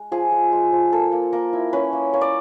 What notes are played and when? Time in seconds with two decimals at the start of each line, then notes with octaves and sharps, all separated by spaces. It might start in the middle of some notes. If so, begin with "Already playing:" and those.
Already playing: G#3
0.12 F3 G#4
0.32 G#3
0.52 G#3
0.72 F3
0.93 A#3 A4
1.12 A#3
1.33 A#3 A#4
1.53 E4
1.73 C#4 B4
1.93 A#3
2.14 A#3 C#5
2.21 D5